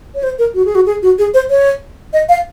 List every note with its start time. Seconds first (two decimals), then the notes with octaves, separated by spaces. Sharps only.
0.15 C#5
0.23 C5
0.39 A#4
0.54 F#4
0.65 G#4
0.75 F#4
0.86 G#4
1.02 F#4
1.18 G#4
1.34 C5
1.50 C#5
2.13 D#5
2.29 F5